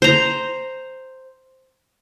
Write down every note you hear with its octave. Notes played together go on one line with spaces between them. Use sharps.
C5 A#5